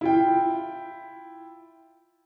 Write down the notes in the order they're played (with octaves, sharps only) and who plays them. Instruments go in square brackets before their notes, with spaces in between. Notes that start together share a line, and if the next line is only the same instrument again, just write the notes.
[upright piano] E4 F4 G5